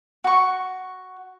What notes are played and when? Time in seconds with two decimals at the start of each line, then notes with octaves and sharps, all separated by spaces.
0.24 F#4 C#6